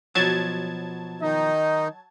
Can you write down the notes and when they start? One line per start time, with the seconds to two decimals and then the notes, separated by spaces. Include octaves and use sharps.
0.15 B2 F3 F#3 A5 G#6
1.22 D#3 D#4 D#5